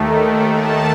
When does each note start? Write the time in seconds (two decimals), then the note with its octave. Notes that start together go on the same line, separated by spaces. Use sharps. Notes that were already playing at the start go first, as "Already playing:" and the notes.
Already playing: D#2 D#3 A3
0.54 A5